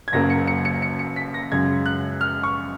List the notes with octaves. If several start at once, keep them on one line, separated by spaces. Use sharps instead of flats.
G#6
F#1 F#2 C#3 F#3 A#3 A#6
C#7
C#7
C#7
C#7
C#7
B6
A#6
F#2 C#3 G#3 G#6
F#6
F6
C#6